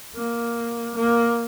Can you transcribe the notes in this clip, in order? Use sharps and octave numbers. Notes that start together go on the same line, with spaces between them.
A#3
A#3